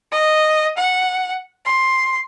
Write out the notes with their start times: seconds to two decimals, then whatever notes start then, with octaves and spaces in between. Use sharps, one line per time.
0.12 D#5
0.78 F#5
1.65 C6